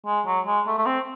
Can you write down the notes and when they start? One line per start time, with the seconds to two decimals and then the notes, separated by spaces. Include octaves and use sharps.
0.07 G#3
0.26 F#3
0.47 G#3
0.67 A3
0.78 A3
0.86 C4